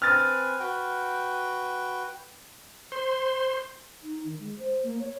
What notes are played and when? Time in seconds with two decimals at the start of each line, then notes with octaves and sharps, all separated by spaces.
0.02 C4 B4 G#5 F6 A6
0.60 F#4 B4 G5
2.92 C5 C6
4.02 D#4
4.25 D#3
4.40 G#3
4.59 C5
4.83 A#3
5.00 C#5